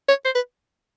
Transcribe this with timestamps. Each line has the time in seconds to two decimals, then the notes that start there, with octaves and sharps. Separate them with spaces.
0.09 C#5
0.25 C5
0.35 B4